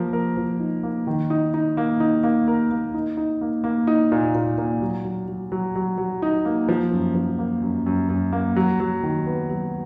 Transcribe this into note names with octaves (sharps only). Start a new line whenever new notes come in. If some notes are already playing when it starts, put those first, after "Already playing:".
Already playing: F3 A#3 A#4
A#4
F3
D#4
A#3
D#3
D#4
D#4
A#3
D#4
A#3
A#4
A#3
D#4
D#4
A#3
A#3
D#4
A#2
A#2
A#2
F#3
F#3
F#3
F#3
F#3
F#3
D#4
A#3
F3
F#2
F3
A#3
F#2
F#2
F#2
A#3
F#3
F#3
D#3
B3
F#3